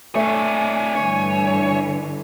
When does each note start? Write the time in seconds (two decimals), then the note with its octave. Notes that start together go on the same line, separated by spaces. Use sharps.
0.15 A3 D4 C#5 G#5
0.95 G2 D3 E3 C#5